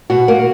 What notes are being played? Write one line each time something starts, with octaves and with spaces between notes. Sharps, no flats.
B2 F#4
A#3